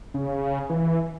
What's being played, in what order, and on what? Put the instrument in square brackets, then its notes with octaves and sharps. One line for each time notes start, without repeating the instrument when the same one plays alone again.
[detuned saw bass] C#3
E3